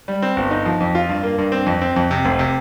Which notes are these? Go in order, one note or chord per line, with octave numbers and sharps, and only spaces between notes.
G3
C4
G1
D#4
F3
F2
F4
G2
A#3
G2
C4
F2
C4
F2
C3
F1
C3